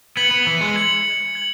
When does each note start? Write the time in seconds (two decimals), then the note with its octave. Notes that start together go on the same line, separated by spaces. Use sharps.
0.17 B3 G#6 C#7 F#7
0.31 B3
0.47 E3
0.61 G#3
0.76 G#6 C#7 F#7
1.35 G#6 C#7 F#7